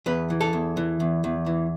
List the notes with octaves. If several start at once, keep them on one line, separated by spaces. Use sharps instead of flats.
E2 B4
E3
A4
E2
E3
E2
E2
E3